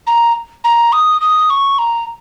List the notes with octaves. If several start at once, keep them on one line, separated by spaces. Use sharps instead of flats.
A#5
A#5
D#6
D#6
C#6
A#5